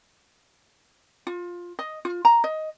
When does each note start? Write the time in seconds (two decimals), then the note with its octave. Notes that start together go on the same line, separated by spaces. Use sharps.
1.27 F4
1.79 D#5
2.05 F4
2.25 A#5
2.44 D#5